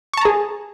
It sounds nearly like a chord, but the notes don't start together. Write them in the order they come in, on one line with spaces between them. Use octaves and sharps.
C#6 A5 A#5 G#4